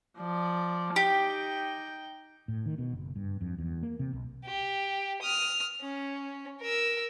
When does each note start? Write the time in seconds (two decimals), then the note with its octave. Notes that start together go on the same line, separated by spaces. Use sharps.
0.18 F3 D5
0.96 D#4 G4 G5
2.48 A2
2.66 D#3
2.78 B2
2.93 F#1
3.16 G2
3.41 F2
3.58 E2
3.83 A#3
3.99 C3
4.13 B1
4.45 G4
5.21 D#6 F6
5.81 C#4
6.61 A#4 E6